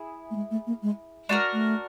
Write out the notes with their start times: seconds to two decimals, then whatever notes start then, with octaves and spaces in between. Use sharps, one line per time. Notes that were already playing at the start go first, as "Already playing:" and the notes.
Already playing: E4 G#4
0.31 A3
0.36 G#3
0.51 A3
0.67 A#3
0.83 G#3
1.29 G#3 D4 F#4 A#4
1.53 A3